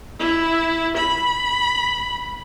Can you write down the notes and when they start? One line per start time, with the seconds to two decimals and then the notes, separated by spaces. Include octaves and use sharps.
0.20 E4
0.97 B5